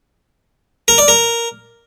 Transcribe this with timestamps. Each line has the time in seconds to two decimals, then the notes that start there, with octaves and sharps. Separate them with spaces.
0.88 A#4
0.98 D5
1.08 A#4